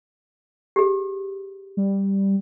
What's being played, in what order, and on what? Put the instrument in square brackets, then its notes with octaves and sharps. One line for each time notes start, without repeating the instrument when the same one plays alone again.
[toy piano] G4 G#4
[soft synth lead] G3